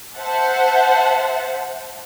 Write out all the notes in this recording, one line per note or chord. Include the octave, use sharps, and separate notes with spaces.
C5 E5 F#5 A5